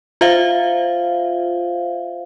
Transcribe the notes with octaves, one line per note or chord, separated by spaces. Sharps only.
F4 C5 E5 F5